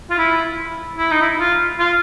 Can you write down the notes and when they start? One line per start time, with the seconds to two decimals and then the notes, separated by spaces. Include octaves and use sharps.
0.11 F4
0.18 E4
0.98 E4
1.11 D#4
1.22 E4
1.40 F4
1.80 F4